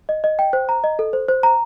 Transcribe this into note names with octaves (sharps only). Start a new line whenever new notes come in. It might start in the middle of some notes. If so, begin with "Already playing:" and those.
D#5
D#5
G5
C5
A#5
D#5
A4
C5
C5
A#5